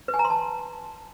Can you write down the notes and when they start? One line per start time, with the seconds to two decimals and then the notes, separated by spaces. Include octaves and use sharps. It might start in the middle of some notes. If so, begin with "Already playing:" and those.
0.08 B4
0.14 G#5
0.19 A#5
0.25 C6
0.30 A5